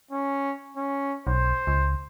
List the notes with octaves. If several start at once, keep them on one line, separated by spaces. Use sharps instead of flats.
C#4
C#4
B1 C5
C#2